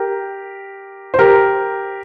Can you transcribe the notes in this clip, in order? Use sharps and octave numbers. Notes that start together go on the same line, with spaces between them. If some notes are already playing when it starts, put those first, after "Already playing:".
Already playing: G4 A#4
C5
G4 A#4